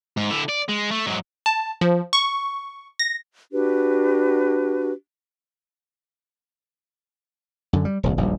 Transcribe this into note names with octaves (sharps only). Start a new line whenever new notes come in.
G#2
D3 E4
D5
G#3
A3
G#2 F#3
A5
F3
C#6
A#6
D4 F#4 G4 B4
F#2 D3
G3
D#1 C2 F2
D#1 A#1 F#2 G3